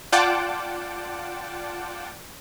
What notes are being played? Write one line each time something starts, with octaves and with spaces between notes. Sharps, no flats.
F4 D5 F#5 G5 A5 D6